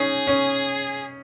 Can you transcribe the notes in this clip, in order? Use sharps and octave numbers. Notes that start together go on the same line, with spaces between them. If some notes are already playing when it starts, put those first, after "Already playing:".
Already playing: C#4 D#4 G#4
C#4